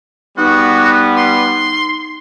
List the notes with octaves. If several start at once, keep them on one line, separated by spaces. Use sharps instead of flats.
G3 B3 D#4 F#4
C6